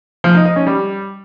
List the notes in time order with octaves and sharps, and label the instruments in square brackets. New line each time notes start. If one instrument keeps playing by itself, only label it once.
[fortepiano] F3
D#4
D#4
C#4
G3